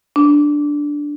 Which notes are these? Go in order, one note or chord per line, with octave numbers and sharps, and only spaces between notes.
D4